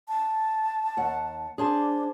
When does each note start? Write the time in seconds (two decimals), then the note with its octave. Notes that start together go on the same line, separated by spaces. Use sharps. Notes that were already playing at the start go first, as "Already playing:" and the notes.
0.08 A5
0.97 D#2 F#5
1.58 D4 G#4 C5 A5